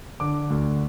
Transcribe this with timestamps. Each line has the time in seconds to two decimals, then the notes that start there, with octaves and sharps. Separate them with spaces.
0.20 D3 D6
0.50 D2